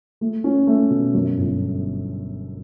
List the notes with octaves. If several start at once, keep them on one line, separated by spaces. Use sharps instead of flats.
A3
C#4
A3
B2
F#2
G1